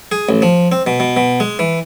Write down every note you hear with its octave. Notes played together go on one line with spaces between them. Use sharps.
G#4
A1
F3
C4
B2
B2
B2
G#3
E3